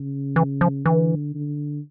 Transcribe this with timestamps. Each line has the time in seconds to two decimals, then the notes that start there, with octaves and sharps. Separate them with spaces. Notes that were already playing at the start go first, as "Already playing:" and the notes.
Already playing: C#3
0.36 E3
0.61 F3
0.86 D3 E3
1.35 D3